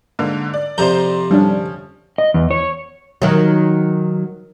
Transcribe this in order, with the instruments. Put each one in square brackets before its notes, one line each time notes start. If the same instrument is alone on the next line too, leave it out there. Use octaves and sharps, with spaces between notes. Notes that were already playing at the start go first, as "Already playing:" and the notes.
[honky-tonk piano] G#2 D3 A#3
D5
[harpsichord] F2 C3 [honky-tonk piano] C5 D5 A#5 [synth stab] G6
[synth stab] G2 D3 D4 [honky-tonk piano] F3 C#4
[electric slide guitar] D#5
E2
C#5
[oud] D#3 F#3